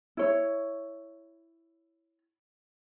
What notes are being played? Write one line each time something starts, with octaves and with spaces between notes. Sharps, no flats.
E4 C#5